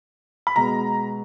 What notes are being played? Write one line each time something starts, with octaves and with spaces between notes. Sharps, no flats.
B5
B2 G#3 B3 A#5